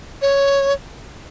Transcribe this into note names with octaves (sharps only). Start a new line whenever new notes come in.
C#5